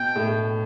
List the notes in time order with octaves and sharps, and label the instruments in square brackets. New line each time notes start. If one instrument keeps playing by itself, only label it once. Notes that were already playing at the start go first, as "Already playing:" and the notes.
Already playing: [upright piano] B2 [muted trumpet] G5
[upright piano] A2